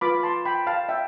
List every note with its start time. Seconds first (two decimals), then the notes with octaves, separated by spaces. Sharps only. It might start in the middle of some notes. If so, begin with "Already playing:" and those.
0.01 F4 B4 B5 D6
0.23 A5 C6
0.45 G5 B5
0.67 F5 A5
0.89 E5 G5